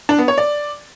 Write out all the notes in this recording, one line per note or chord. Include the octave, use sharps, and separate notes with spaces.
D4
B3
C#5
D5